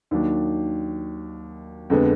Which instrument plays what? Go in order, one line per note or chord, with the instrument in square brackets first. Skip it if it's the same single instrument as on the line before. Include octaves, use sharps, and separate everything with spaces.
[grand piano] D#2 D#3 F#3 D4
F2 D3 G#3 B3